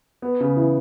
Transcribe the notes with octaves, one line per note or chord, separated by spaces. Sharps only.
B3
C#3
E3